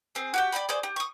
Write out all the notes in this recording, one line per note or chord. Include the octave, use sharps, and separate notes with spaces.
C4 G#4
F#4 G4 G5
D5 E5 G5 B5
G#4 C5 D5
G4
C#6 D#6